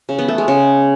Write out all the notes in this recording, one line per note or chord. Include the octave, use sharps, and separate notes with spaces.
C#3
B3
A3
G#3
C#3